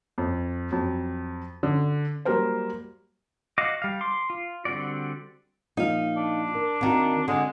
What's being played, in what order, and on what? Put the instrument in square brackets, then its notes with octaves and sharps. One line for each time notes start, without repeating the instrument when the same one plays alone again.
[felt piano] F2
F2 F#3
D3
F#3 G3 A#3 A#4 C5
[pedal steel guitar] F#4 D#5 F5 D6
G3 F5
C6 D6
F4
D3 G3 C4 F#4 D5
[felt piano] A#2 F3 [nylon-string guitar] D#4 F5
[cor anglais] D4
[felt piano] A#4
[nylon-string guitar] D#2 D#3 [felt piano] C4 F#4
[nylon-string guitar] D3 [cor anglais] G#3